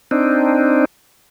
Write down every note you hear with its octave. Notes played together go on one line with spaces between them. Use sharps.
C4 D4 D#4